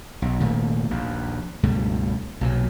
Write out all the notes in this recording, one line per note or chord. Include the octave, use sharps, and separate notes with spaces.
B1
F1 A#2 D#3 A3
A#1 D#2
C#2 G2 B2 A3
B1 A#2 F#3